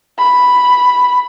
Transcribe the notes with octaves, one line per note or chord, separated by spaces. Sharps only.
B5